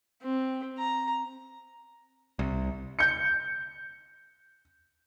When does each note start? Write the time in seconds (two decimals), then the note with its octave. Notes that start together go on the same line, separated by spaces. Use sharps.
0.22 C4
0.78 A#5
2.39 C2
2.99 G6 C#7